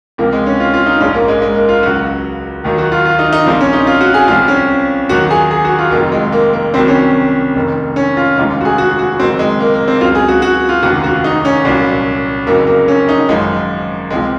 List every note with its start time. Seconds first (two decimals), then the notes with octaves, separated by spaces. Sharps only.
0.18 C#2 C3 F3 A#3
0.33 G#3
0.47 C#4
0.60 F4
0.74 F4
0.86 D#4
1.00 A#1 G#2 F3 C#4
1.14 A#3
1.28 G#3
1.42 G#3
1.56 A#3
1.69 F4
1.82 C#2 C#3 F#3 F#4
2.64 D#2 D#3 F#3
2.78 F#4
2.92 F4
3.05 F4
3.19 D#4
3.33 D#4
3.46 A#1 A#2 F3 C4
3.60 C#4
3.73 D#4
3.87 F4
4.01 F#4
4.14 G#4
4.28 C2 C3 F3 F4
4.48 C#4
5.09 D#2 D#3 F#3 F#4
5.31 G#4
5.51 G#4
5.65 F#4
5.79 F4
5.91 F1 F2 D#3 F#3 A#3
6.12 G#3
6.32 A#3
6.53 A#3
6.74 C2 C3 D#3 F#3 C4
6.88 C#4
7.56 F1 F2 D#3
7.96 C#4
8.17 F4
8.37 F1 D#2 C#3 F3 G#3
8.61 F#4
8.65 G#4
8.78 F#4
8.99 F#4
9.20 F#1 F2 C3 D#3 F#3 C4
9.39 G#3
9.60 A#3
9.74 A#3
9.88 C4
10.01 C#2 C#3 F#3 F4
10.15 G#4
10.28 F#4
10.42 F#4
10.69 F4
10.83 F1 D#2 C#3 F3 F#4
11.04 F#4
11.24 D#4
11.45 C#4
11.65 C2 A#2 F#3
12.47 F#1 F2 C#3 F#3 A#3
12.67 A#3
12.88 C#4
13.09 D#4
13.29 G#1 F#2 F3 G#3
14.10 C#2 C3 F3 G#3